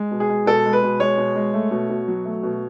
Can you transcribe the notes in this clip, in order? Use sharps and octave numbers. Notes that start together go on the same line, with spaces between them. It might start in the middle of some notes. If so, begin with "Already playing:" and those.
Already playing: G#3
B2
G#4
G#3
B2 A4
G#3
B4
B2
G#3 C#5
B2
G#3
A3
B2
B2
F#3
A3
B2